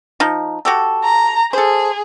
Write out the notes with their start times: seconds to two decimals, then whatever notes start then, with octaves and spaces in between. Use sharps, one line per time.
0.20 F3 D#4
0.65 F#4 G4 A4
1.04 A#5
1.53 G#4 A4 C5